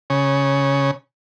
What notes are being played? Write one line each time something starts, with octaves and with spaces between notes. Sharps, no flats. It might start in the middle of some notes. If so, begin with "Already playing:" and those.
C#3